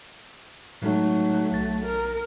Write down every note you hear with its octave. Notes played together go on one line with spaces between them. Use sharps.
A2 F#3 G#3 A3 D#4
B1 A6
A#4